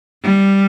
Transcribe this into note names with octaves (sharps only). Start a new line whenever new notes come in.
G3